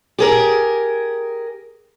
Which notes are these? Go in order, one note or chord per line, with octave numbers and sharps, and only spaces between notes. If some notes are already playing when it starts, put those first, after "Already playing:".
G4 G#4 A#4